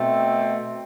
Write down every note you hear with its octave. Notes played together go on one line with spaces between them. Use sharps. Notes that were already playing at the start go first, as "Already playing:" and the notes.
Already playing: B2 A3 C4